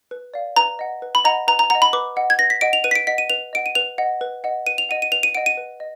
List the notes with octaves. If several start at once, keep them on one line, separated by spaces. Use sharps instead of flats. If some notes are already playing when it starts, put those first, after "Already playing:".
B4
D5 F5
B4 A#5
D#5 F#5
B4
B5
D#5 F#5 A#5
B4 A#5
A#5
D#5 F#5 A#5
B5
B4 D6
D#5 F#5
G#6
B4 A#6
B6
D#5 F#5 D7
F7
B4 D#7
B6
D7
D#5 F#5 B6
D#7
B4 F7
D#5 F#5 D7
D#7
B4 F7
D#5 F#5
B4
D#5 F#5
B4 D#7
F7
D#5 F#5 D#7
D#7
B4 F7
D#7
D#5 F#5 D7
D#7
B4
D#5